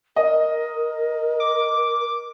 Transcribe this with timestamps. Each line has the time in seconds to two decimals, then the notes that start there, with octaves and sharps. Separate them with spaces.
0.16 A#4 D#5
1.40 D6